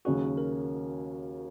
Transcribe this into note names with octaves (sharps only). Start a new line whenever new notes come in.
D#2 C#3 F#3 C#4 F#4 G#4
A#4